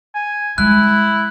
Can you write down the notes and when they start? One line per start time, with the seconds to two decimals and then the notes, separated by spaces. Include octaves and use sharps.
0.15 G#5
0.58 G3 G#3 E4 F#6